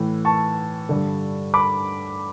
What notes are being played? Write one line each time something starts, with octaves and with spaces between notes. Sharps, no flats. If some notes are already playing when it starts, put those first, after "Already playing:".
Already playing: A2 E3
A5 C#6
G2 D3
B5 D6